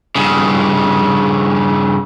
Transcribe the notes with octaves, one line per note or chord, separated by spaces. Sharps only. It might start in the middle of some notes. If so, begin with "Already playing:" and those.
G2 C#3